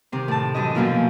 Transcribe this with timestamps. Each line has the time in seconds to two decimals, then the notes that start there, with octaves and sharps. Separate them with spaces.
0.12 C3 D#3 C4
0.28 A2 A5
0.54 F#2 E3 C#4 D#5
0.75 F#2 B2 F3 A#3 E4 F4